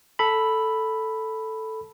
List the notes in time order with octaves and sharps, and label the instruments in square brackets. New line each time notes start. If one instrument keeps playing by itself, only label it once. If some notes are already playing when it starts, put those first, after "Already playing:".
[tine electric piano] A4 B5